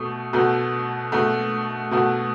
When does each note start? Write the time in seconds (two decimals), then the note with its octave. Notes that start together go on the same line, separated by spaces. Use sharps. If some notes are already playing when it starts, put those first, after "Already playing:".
Already playing: B2 A3
0.33 B2 A3 F#4
1.12 B2 A3 F#4
1.91 B2 A3 F#4